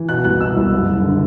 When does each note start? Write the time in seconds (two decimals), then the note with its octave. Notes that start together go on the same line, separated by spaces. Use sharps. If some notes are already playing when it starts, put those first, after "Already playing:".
Already playing: E3
0.09 B2 F#6
0.24 C2 F#6
0.40 B2 E6
0.57 C2
0.72 F#1
0.88 F#1
1.03 D3